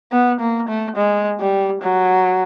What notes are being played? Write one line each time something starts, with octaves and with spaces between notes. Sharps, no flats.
B3
A#3
A3
G#3
G3
F#3